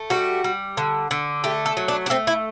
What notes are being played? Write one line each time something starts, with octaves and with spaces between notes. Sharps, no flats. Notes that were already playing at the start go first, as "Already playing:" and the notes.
Already playing: A3
G3 F#4
G3
D3
D3
A3 G4
A4
F#3
D4
D4
A3 C4
E4